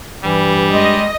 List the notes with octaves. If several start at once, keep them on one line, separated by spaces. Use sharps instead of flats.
G2 E3 G3
G#3 D#5